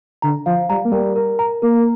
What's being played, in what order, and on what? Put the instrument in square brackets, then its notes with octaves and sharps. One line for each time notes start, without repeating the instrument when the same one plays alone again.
[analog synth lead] D3 [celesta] A#5
[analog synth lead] F3 [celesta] F5
[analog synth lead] G3 [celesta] A#5
[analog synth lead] A#3
[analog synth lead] G3 [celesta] A#4
[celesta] A#4
A#5
[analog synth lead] A#3 [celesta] A#4